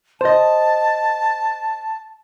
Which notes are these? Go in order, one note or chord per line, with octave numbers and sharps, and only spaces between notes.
C5 D#5 A5